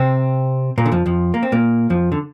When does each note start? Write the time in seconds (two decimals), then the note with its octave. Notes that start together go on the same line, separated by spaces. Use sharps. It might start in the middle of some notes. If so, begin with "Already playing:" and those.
Already playing: C3 C4
0.78 A#2 A#3
0.86 D3
0.92 F2 F3
1.06 F2 F3
1.34 A#3
1.43 C4
1.52 A#2 A#3
1.90 F2 F3
2.12 D3